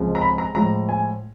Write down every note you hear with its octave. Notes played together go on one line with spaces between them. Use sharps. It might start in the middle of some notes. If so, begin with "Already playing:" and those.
Already playing: C#2 C3 F3 G#3
A#5
B5
A#5
A2 F3 G#3 A#5
G#5